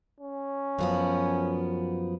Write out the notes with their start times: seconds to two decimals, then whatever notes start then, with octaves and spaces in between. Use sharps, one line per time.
0.21 C#4
0.79 F#2 F3 B3